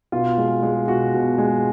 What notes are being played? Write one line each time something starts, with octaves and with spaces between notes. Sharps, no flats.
B2 F4
G#3
G#3
B2 F#4
B2
G#3